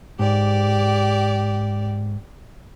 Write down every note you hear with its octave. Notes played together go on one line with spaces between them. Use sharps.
G#2 G4 D5